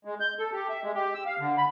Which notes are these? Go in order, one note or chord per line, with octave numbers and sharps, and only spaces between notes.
G#3
G6
A4
G4
E5
G#3
G4
E6
F5
D3
B5